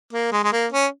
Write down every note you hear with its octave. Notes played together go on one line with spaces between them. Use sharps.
A#3
G#3
G#3
A#3
C#4